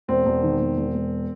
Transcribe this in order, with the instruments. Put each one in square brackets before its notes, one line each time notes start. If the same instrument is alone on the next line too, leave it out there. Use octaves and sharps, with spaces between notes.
[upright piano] E1 C4
E1
D#3
E1
E1
E1